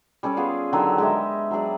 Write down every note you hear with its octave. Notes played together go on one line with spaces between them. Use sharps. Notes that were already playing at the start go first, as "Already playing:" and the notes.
G3 C#4 A4 D5
B3 F4 G#4
D3 D#3 F#3 G4
G#3 G4 D#5 E5
F#3 D4 G#4 D5